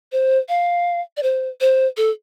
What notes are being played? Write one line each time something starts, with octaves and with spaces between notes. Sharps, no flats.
C5
F5
D5
C5
C5
A4